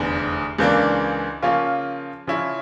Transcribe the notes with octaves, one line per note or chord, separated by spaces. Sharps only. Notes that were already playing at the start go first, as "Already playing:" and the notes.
Already playing: F1 E2 D3
C#2 C#3 E3 A#3 D4
C#3 F3 A#3 C#4 F4
C#3 F3 C#4 E4